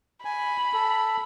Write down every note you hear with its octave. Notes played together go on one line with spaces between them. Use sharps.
G#5 B5
A4